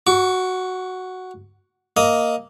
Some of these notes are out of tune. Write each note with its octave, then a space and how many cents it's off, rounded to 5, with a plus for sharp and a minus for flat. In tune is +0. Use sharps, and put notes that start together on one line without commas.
F#4 +0 C#6 +45
A#3 +0 D#5 +10